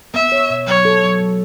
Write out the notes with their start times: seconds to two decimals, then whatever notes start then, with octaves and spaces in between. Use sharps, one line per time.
0.14 B3 E5
0.32 C#5
0.50 B2
0.67 F#3 C#5
0.85 A4
1.03 F#3
1.21 F#3